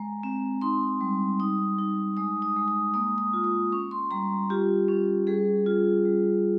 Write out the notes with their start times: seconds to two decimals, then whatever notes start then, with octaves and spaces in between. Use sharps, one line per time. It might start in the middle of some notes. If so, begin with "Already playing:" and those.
Already playing: G#3 A#5
0.23 C4
0.61 D#4 C6
1.01 G3
1.40 D#4 D#6
1.79 D#4
2.17 G#3 D#6
2.42 D#6
2.56 G#3
2.68 D#6
2.94 A#3 D#6
3.18 D#6
3.33 F4
3.44 D#6
3.72 C#4 C#6
3.91 C6
4.11 G3 A#5
4.50 F4 G4
4.88 C#4
5.27 G3 G#4
5.66 F4
6.05 G3